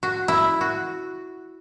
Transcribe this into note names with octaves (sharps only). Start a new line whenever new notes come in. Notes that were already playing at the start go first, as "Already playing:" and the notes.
F#4
E4
F#4